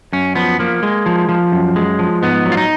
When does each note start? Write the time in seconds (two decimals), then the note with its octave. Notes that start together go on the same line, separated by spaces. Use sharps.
0.13 F#2 C#4
0.35 F3 B3
0.59 F3 A#3
0.83 G#3
1.06 F3
1.29 F3
1.52 F#2
1.76 G#3
1.99 F3
2.22 G#2 B3
2.46 F#3
2.52 F4
2.57 D#4